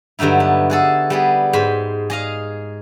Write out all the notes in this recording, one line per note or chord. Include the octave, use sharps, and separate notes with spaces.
G2 D3 F#3 D#4 E4
B3
F#4 G#4 A4
G3 B3 G#4
G#2 C5 B5
G#4 D#5 F5